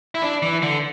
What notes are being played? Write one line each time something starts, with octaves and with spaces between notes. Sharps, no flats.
E4
D4
E3
D3